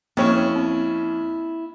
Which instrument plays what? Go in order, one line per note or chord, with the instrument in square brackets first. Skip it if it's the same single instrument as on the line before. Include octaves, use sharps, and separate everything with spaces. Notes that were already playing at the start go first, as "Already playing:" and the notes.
[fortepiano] F2 C#4 [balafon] A#3 [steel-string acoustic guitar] E4
[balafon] C4